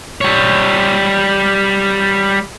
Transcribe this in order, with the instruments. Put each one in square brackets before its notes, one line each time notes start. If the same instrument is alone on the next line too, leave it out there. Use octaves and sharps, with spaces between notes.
[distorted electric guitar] G3 C#5